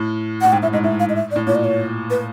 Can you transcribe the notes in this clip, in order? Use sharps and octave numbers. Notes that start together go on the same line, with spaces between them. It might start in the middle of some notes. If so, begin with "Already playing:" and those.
Already playing: A2
A2 F#5
G#2 G5
A2 E5
G#2 D#5
A2 E5
F5
D#5
E5
D5
A2
A#2 C#5
D5
C#5
B4